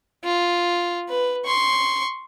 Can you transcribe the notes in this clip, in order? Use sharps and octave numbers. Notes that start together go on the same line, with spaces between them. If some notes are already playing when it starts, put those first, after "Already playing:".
F4
B4
C6 C#6